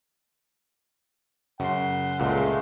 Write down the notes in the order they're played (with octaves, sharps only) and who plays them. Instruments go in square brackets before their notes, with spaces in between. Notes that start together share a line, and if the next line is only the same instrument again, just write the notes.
[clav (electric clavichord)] F#2 [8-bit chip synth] C#3 C6 [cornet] F#5
[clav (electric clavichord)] C#2 A#2 [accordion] G#3 A3